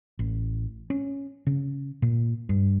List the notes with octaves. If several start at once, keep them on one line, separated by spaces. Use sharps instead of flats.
A1
C#4
C#3
A#2
G2